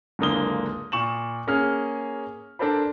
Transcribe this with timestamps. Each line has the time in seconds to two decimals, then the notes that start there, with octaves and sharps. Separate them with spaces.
0.19 F#1 C#2 D3 A#3 D#6 G7
0.92 A#2 C#6 E7 F#7
1.47 A#3 C#4 G#4 F6
2.59 D4 A4 A#4 C5 D5 B5